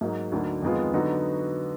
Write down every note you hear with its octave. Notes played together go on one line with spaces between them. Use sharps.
G#2 F#3 A#3 D#4
D2 D3 F#3 A#3 D#4
F2 D#3 G#3 B3 F4
D3 F#3 B3 D#4 F#4